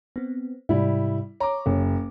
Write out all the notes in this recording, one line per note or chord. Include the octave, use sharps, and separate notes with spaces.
B3 C4
G#2 C3 G3 E4
C#5 A#5 D6
F#1